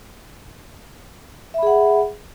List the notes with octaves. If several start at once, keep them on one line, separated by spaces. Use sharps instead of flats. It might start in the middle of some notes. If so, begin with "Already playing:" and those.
G#4 E5 F#5 B5